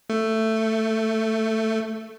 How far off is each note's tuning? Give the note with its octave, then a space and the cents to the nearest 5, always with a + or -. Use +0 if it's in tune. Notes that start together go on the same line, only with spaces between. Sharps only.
A3 +10